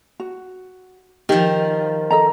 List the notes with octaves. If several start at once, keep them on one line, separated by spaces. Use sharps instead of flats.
F#4
D#3 F3 G4
A4 D#5 A#5